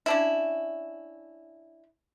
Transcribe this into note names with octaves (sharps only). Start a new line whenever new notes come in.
C#4 D4 E4